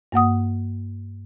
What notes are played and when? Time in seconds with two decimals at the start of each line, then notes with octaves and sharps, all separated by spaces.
0.12 G2 A#3 F#5 D#6